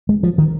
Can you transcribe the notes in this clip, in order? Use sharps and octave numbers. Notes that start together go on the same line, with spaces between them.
G#3
F3
D#3